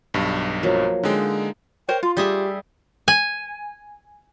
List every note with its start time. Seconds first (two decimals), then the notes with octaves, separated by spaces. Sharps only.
0.14 B1 G2
0.63 F3 F#3 A#3
1.03 D3 G#3 D#4 F5 G5
1.88 A#4 C5 C#5 G5
2.03 F4 C6
2.17 G3 G4 G#4 E5
3.08 G#5